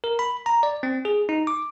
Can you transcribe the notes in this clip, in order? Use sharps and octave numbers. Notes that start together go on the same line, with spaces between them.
A#4
B5
A#5
D5
C4
G#4
D#4
D6